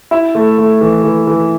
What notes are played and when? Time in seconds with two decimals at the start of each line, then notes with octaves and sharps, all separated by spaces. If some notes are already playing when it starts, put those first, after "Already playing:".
0.11 E4
0.35 A3
0.58 A3
0.81 E3
1.04 E3
1.27 E3